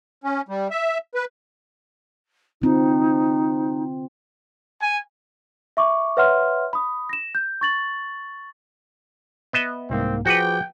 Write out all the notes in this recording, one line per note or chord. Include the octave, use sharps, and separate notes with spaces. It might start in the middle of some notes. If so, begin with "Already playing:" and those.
C#4
G3
E5
B4
D3 C4 D#4 F4
G#5
E5 C#6 D6
B4 C#5 E5 F#5 C6 F6
B5 D#6
A#6 E7
G6
C#6 A6 F#7
B3 D#5 E5
C2 G#2 A#3 C4
F3 F#4 G#4 B4 G5 D6